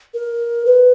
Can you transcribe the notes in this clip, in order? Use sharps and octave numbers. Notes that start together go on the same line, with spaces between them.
A#4
B4